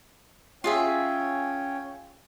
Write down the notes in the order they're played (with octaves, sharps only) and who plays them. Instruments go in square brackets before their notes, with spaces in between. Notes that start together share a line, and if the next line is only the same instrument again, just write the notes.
[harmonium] C#4 C#5 G5 [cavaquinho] F4 G#4 E5